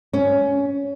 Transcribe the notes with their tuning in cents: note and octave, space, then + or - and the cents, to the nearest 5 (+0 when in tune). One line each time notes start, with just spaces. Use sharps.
C#4 +15